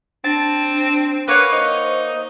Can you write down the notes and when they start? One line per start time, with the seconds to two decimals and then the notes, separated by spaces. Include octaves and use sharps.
0.24 C4 D4 A5
1.28 A#3 B4 C#5 F#5
1.52 D#4 C5